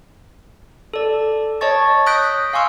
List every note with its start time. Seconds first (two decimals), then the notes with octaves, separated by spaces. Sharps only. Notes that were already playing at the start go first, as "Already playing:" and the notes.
0.94 A4 D5
1.61 C#5 D#5 A5 C#6 A6
2.06 D#6 F#6 G6 A#6 B6 D7
2.53 F5 G#5 C6 C#6 E6 F6